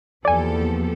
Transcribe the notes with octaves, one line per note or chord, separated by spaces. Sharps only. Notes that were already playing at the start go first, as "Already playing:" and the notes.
E2 F3 A#3 G4 A4 D5 G#5